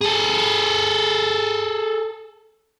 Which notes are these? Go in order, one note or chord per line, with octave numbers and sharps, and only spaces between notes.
G#4 A4